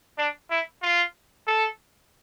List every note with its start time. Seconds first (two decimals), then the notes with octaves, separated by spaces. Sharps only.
0.18 D4
0.50 E4
0.82 F4
1.47 A4